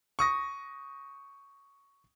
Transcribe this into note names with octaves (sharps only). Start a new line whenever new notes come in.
C#6 D#6 A#6